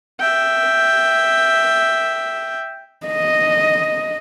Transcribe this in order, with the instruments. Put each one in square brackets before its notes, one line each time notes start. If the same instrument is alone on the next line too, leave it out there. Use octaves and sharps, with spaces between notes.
[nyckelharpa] E5 G5
[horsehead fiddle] D#5